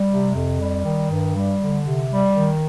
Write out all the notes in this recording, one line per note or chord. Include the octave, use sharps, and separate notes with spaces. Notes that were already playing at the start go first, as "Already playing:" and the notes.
Already playing: G3
C3
F2
G3
D#3
G2
G3
D3
C3
G3
D#3